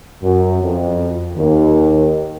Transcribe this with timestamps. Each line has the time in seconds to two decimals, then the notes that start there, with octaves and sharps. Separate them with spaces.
0.23 F#2
0.62 F2
1.37 D#2